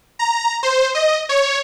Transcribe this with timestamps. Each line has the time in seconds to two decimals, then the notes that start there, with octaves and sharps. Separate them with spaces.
0.19 A#5
0.63 C5
0.95 D#5
1.29 C#5